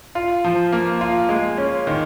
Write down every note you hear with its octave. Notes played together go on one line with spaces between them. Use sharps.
F4
F3
A#3
F4
G#3
C#4
D#3